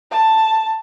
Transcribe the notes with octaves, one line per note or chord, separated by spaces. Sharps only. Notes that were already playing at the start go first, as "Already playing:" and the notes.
A5